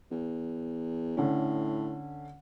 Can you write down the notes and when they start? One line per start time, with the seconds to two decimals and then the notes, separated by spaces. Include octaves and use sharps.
0.11 E2
1.17 A2 D3 C#4